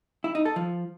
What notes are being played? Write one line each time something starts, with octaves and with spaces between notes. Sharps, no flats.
E4
D#4
A4
F3